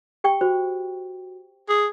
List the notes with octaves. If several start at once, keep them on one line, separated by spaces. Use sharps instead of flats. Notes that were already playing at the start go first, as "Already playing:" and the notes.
G4 G5 C#6
F#4 C5
G#4